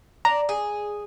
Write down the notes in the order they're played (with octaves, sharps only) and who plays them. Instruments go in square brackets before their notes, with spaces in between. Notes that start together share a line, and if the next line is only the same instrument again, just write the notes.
[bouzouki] D4 [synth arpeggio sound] A#5
[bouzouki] G#4